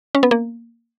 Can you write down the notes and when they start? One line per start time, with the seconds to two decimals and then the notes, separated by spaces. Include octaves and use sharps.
0.15 C#4
0.23 B3
0.31 A#3